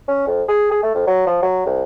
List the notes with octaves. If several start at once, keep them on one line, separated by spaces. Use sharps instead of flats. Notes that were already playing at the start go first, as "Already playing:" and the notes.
C#4
F2
G#4
G#4
A3
F2
F#3
F3
F#3
C2